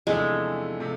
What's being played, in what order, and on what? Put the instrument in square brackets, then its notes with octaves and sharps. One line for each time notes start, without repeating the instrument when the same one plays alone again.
[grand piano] E2 C3 F3 A3 D4 [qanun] G#3
[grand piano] C3 F3 A3